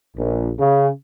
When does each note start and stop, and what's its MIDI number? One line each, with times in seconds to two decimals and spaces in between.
0.17 0.52 34
0.59 0.89 49